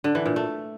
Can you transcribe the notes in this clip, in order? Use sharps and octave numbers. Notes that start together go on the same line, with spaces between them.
D3
E3
A#2
A3